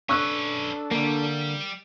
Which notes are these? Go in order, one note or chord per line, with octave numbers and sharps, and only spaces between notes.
C#4 D4 A4 B4 C#6 E6 F#6
D3 G3 A#3